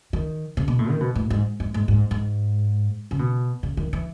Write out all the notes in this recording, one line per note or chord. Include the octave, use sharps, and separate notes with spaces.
D#3
C#3
B2
A2
D#3
B2
A2
G#2
G#2
G#2
G#2
G#2
C#3
B2
C#3
D#3
E3